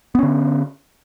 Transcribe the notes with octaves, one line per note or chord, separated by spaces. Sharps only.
D3 B3 C#4